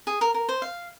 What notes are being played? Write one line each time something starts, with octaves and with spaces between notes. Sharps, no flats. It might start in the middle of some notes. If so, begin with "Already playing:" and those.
G#4
A#4
A#4
C5
F5